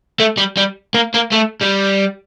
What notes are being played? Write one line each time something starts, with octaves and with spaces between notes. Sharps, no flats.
A3
G3
G3
A#3
A#3
A3
G3